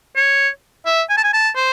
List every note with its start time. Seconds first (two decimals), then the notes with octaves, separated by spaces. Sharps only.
0.16 C#5
0.86 E5
1.09 G#5
1.17 A5
1.24 G#5
1.33 A5
1.55 C5